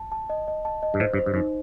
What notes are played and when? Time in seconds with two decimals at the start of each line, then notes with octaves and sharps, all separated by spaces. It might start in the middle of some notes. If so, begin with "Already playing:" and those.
Already playing: A5
0.12 A5
0.30 D#5
0.48 D#5
0.65 A5
0.83 D#5
0.94 G2
1.00 A2 C5
1.13 G2
1.18 C5
1.26 G2
1.34 F#2 D#4